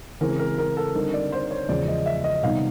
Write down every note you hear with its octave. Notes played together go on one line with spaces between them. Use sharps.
C#3 E3 G#3 C4 A#4
A#4
A#4
A4
D3 G3 C4 D#4 A#4
D5
C5
C#5
E2 C#3 F3 G#3 D5
D#5
E5
D#5
C3 D#3 G3 B3 D#4 F5